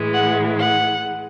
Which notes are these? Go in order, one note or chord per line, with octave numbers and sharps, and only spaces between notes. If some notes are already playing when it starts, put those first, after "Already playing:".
Already playing: A2 E3 G#3
F#5
F#5